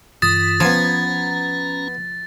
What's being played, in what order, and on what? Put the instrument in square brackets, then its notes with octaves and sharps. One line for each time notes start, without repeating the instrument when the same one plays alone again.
[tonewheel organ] G2 E3 F4 [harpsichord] D#6 [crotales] A6
[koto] F3 [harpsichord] B3 G#5 [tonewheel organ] C#4 A#5